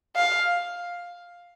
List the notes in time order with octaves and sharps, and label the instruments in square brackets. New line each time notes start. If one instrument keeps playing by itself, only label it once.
[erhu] F5